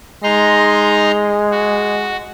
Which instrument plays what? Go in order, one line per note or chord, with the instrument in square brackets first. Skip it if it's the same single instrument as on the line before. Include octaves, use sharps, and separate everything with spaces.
[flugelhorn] G#3 [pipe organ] D#4 A#5 C6
[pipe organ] F#4